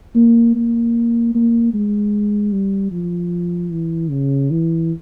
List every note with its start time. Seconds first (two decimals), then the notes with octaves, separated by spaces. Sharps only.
0.15 A#3
0.55 A#3
1.35 A#3
1.74 G#3
2.53 G3
2.92 F3
3.72 E3
4.10 C#3
4.51 E3